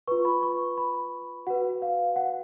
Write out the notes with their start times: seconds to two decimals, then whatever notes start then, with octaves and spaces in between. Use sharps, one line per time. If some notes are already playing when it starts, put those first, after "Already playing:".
0.08 F4 B4 C#6
0.25 B5
0.43 C#6
0.78 B5
1.47 F#4 B4 F#5
1.82 F5
2.16 F#5